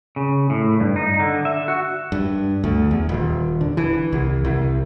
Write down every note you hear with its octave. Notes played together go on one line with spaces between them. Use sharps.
C#3
A2
G2
D#4
D3
E5
F#4
G2
D2
E2
D#1
D3
E3
C2
C2